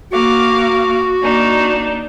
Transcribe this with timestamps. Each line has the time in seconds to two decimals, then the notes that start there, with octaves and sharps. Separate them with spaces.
0.11 A#3 F#4 F5 D6
1.21 A#3 D4 D#4